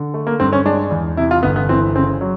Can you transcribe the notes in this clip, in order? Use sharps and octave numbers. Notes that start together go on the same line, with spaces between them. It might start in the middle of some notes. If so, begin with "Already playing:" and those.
Already playing: D3
A3
A#3
G2 C4
C#4
G#3 D4
E2
C3 E4
F4
G1 B3
B3
E3 C4
C#3 C4
F#3